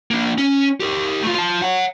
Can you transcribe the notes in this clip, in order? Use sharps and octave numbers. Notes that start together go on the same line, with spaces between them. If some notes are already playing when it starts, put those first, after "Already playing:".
A#3 D4
C#4
G4 A#4
A3 F4
F4 A5
C#5 F#5